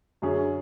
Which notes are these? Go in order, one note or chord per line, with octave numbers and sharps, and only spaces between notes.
F#2 D3 F#3 C#4 G#4